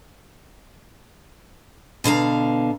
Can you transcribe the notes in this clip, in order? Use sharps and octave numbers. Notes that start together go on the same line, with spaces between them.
B2 D3 F5 A#5